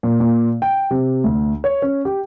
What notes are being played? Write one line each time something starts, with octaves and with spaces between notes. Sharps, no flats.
A#2
A#2
G5
C3
D2
C#5
C#4
G4